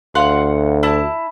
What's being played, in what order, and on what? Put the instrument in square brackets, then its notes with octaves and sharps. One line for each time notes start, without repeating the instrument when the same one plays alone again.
[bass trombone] D2 [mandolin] F5 F#5 C6
[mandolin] E4 A5